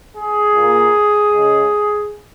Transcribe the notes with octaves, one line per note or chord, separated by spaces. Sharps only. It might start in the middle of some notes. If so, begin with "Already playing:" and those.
G#4
A#2 A#3
C#3 G#3